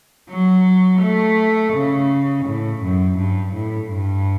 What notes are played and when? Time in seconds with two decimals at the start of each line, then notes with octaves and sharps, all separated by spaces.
0.30 F#3
1.02 A3
1.74 C#3
2.46 A2
2.83 F#2
3.18 G2
3.54 A2
3.90 G2